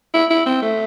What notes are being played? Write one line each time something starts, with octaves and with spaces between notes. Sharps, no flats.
E4
E4
C4
A3